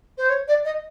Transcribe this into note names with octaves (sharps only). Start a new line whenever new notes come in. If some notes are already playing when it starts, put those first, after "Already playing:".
C5
C#5
D5
D#5